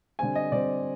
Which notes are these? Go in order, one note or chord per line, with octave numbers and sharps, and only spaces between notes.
D3 G3 C4 G#5
D#5
D3 G3 C4 D5